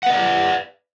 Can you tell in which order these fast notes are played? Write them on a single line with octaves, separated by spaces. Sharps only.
F#5 B4 D#5 D5